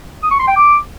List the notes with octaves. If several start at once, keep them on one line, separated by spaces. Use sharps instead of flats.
D#6
C#6
C6
G5
D6